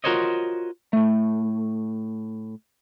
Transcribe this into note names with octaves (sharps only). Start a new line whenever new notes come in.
F4 F#4 A#4 C5 C#5 D#5
A2 A3